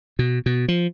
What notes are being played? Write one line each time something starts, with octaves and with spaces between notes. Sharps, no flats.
B2
B2
F3